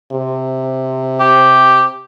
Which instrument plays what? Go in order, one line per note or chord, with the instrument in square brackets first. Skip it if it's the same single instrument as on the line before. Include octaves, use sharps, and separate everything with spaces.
[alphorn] C3
[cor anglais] G4